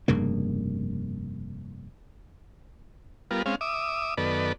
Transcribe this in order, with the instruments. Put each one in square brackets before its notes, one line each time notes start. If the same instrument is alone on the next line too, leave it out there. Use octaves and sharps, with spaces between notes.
[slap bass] F1 G2 C#3 A#3
[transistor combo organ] G3 B3 F4 A#4
G#3 C4 C#4 F5
E5 D6 D#6
F#2 D#3 B3 A4 B4 D5